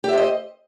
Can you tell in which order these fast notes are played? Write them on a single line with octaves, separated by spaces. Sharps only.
G4 E5 C5 D#5